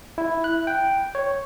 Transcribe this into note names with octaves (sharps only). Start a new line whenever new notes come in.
E4
F#6
G5
C#5